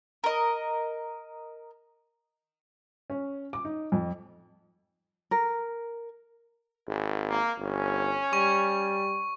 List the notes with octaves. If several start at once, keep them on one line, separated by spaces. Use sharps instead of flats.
A#4 D#5
C#4
D6
D#4
F2
A#4
G#1
A#3
G1 C#4
G3 C#6